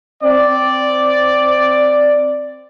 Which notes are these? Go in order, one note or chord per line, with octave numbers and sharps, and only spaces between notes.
C4 D5